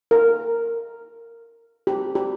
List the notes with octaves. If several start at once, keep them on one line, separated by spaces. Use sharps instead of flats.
A#4
G4
G4